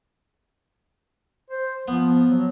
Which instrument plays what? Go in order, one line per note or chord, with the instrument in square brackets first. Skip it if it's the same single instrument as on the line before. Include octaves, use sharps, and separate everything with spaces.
[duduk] C5
[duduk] F3 [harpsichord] B3
[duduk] F#3